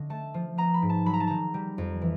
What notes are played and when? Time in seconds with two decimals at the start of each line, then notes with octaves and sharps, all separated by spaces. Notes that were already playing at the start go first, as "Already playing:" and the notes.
Already playing: D3 C#4 D#5
0.10 A3 A5
0.34 F3
0.58 B3 A#5
0.74 B5
0.82 G#2
0.89 A5
1.06 F#3 B5
1.13 A#5
1.20 A5
1.27 D#3 A#5
1.54 G3
1.78 F2
2.02 E3